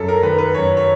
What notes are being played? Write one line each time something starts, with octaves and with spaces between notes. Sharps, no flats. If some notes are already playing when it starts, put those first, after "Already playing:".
Already playing: F#2 A4
A#4
D#3 B4
B4
F#2 C#5
C#5